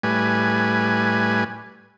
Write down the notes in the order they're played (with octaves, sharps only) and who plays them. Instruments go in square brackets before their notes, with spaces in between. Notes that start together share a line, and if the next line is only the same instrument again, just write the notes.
[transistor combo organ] A2 G3 B4 G#5